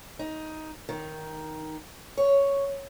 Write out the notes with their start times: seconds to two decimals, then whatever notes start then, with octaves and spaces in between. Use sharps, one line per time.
0.19 D#4
0.89 D#3
2.17 C#5